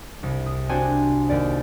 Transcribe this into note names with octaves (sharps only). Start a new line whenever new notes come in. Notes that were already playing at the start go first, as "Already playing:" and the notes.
C2
D#6
C4 D4 F#4 C5 G#5
D#2 D5